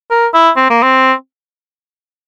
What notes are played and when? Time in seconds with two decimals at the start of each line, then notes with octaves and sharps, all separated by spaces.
0.11 A#4
0.34 E4
0.56 C4
0.70 A#3
0.83 C4